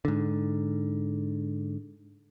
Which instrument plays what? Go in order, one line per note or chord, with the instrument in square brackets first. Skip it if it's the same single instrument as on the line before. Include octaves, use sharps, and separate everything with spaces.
[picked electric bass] G#2 D3